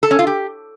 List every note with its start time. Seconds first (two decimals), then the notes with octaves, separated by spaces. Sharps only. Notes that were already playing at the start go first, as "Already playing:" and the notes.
0.03 A4
0.11 C#4
0.19 F4
0.27 G4